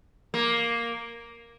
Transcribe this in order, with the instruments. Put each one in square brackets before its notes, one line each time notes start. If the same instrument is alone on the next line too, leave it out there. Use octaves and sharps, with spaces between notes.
[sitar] A#3